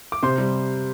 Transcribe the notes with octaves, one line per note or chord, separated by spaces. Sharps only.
D6
C3 C5 C6
G3